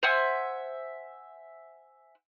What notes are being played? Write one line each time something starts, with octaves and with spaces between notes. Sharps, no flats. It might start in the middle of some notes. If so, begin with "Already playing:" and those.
C5 E5 F#5 G#5